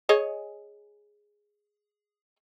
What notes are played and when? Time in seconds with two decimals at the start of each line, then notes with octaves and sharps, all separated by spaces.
0.09 G#4 C#5 D#5